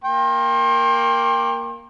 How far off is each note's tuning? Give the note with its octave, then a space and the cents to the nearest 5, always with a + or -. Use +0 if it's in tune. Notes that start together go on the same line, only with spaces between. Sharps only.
A#3 +0 G5 +20 C6 +40